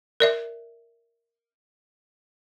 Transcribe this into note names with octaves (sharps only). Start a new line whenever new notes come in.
A#4 D5 E5